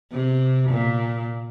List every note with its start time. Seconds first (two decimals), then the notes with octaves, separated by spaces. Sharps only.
0.12 C3
0.70 A#2